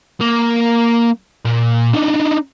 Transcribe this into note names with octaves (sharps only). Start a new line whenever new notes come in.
A#3
A#2
D4 D#4